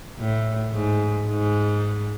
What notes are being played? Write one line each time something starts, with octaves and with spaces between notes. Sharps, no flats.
A2
G#2
G#2